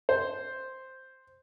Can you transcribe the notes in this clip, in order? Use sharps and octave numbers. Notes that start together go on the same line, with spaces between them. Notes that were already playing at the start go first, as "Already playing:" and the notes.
C5